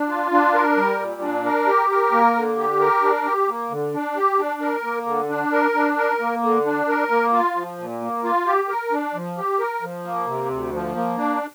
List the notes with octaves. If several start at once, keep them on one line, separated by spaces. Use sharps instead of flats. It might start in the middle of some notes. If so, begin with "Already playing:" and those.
Already playing: D4
F4
D4
A#4
G3
A#2
D4
A#4
G4
A#4
A#3
D3
G4
A#4
D4
G4
A#3
D3
D4
G4
D4
A#4
A#3
D3
D4
A#4
D4
A#4
A#3
D3
D4
A#4
A#3
F4
F3
A#2
A#3
F4
G4
A#4
D4
F3
G4
A#4
F3
A#3
C3
D2
F3
A#3
D4